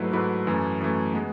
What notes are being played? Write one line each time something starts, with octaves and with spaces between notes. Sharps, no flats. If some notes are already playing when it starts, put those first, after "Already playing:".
Already playing: G#2 F#3 A3 E4 B4
G#2 F#3 A3 E4 B4
F#2 E3 A3
F#2 E3 A3
G#3 B3